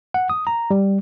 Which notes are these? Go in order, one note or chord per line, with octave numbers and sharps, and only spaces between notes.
F#5
D#6
A#5
G3